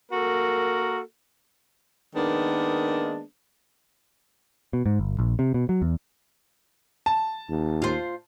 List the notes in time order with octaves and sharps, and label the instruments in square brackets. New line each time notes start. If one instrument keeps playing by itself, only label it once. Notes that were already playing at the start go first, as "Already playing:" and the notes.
[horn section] A#3 F#4 A4 A#4
[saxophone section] D#3 G#3 A#3 B3 D4
[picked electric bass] B2
G#2
G1
A#1
C3
B2
F#3
E2
[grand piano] A5
[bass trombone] D#2
[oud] F4 C5